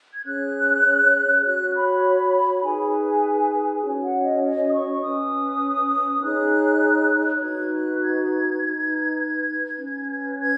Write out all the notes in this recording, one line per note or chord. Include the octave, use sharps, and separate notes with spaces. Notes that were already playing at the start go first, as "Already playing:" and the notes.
G#6
C#4 G#4 C#5 F#6
F#4 C#5 F#6
B5
D#4 G#4 B4 G#5
C#4 F#4 C#5
F#5
D#5
D#5
D#6
C#6
C#4 B4 D#6
D#4 G#4 C#5 F#6
D#4 F#4 B4 G#6
F#6
G#6
D#4 B4
C#4 B4
G#6